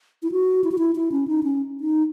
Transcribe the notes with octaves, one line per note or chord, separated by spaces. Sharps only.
E4
F#4
E4
F#4
E4
E4
C#4
D#4
C#4
D#4